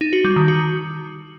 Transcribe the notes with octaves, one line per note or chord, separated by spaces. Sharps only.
D#4
F#4
G3
D#3
F#4